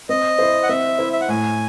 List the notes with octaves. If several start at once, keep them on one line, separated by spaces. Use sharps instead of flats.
C4 D#5
E4 C5
F#5
C4 E5
E4 C5
E5
F#5
A2 G#5